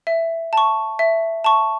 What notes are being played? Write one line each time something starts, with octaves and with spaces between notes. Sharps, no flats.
E5
A5 C#6
E5
A5 C#6